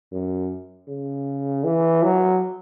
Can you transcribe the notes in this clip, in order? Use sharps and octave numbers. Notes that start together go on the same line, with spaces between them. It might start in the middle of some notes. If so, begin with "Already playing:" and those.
F#2
C#3
E3
F#3